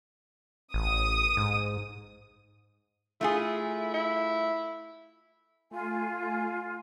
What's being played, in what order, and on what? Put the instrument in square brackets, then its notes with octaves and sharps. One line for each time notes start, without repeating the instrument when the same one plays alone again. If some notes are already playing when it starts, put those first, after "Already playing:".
[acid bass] A1 [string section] D#6
[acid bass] G#2
[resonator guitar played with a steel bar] A3 F4 G#4 [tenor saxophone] E4
[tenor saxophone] E4
[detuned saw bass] A3 [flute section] F4 G#5